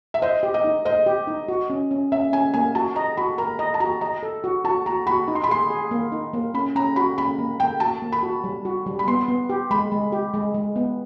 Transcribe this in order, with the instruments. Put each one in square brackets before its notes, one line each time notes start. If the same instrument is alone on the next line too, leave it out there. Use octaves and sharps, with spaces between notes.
[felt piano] E5
[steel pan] C5 [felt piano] D#5
[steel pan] G4
[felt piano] D#5
[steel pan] D#4
[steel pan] C5 [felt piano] D#5
[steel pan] G4
D#4
F#4
C#4
C#4
[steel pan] C#4 [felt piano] E5
[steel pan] C#4 [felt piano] G#5
[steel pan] A#3 [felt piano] G#5
[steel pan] F#4 [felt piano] A5
[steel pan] D#5 [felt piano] A#5
[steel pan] F#4 [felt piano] B5
[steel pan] A#4 [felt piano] A#5
[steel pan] D#5 [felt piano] A#5
[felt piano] A5
[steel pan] F#4 [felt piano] A#5
[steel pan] D#5 [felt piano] A#5
[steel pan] A4
F#4
[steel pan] F#4 [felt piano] A5
[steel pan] F#4 [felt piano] A#5
[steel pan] F#4 [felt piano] B5
[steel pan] D#4
[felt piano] C6
B5
[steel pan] G#4 [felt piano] C6
[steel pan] G#4
A#3
D#4
A#3
[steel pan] C#4 [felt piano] B5
[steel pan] C#4 [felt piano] A#5
[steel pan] F#4 [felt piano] B5
[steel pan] C#4 [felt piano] B5
[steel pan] A#3
[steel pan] A#3 [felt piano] G5
[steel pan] F#4 [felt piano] A5
[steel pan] A#3
[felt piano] B5
[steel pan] F#4
G3
F#4
G3
[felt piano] B5
[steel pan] B3 [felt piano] C6
[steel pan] B3
G4
[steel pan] G#3 [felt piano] B5
[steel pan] G#3
G4
G#3
G#3
B3